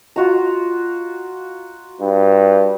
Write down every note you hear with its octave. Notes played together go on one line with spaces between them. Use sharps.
F4 F#4 A#5
G2